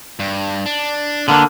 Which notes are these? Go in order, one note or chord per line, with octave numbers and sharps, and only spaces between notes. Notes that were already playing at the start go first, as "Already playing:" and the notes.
G2
D4
D3 A#3 B3 D4